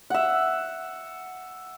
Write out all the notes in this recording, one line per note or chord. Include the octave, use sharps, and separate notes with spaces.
E5 F#5